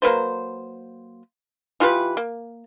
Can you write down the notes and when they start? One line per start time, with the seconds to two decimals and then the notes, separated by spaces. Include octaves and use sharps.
0.02 F#3 A#3 B4 C5
1.80 E3 F4 G4 B4
2.17 A#3